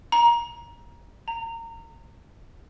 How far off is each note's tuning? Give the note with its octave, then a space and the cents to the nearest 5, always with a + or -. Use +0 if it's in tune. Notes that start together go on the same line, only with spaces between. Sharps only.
A#5 +20
A#5 -25